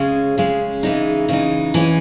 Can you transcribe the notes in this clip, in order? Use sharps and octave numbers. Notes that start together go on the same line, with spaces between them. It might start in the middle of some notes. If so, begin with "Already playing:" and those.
Already playing: C#3 G#3 C#4
C#3 G#3 C#4
C#3 E3 G#3 D#4
C#3 E3 G#3 D#4
E3 G#3 C#4